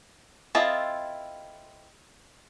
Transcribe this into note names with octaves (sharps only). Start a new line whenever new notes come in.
C4 E4 F4 A4 D#5